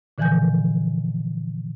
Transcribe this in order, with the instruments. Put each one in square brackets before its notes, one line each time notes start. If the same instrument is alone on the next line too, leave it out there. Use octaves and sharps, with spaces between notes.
[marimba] A#2 D3 E3 F3 G#5 G6